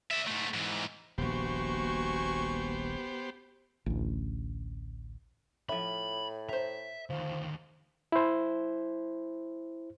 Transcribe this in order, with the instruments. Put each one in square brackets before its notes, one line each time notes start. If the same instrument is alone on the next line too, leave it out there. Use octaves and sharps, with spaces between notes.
[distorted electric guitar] D5 E5
G#2 A3
G#2 E3
[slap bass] D#1 A#1 [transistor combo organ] B3 G4 C5 [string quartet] F#4 G#5 C#6
[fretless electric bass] A1 D2
[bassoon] A2 [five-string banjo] F3 E5 [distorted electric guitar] B5
[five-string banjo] C5 A#5 [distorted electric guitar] E5
[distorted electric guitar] D2 D#3 [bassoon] F3
[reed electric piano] E4 C5